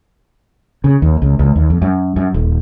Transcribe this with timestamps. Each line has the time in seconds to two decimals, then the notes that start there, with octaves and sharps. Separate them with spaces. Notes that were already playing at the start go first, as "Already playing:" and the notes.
0.84 C#3
1.02 D#2
1.22 C#2
1.39 C#2
1.56 D#2
1.70 F2
1.82 F#2
2.16 F#2
2.34 D#1